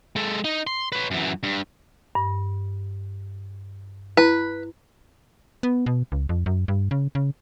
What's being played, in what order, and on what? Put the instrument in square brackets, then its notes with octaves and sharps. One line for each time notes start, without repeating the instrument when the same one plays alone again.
[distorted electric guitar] G#3 A4
D#4
C6
B4 C#5
F#2 E3
G2
[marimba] G2
[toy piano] E4 [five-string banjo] B4
[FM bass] B3
B2
C#2
F2
F#2
G2
C#3
C#3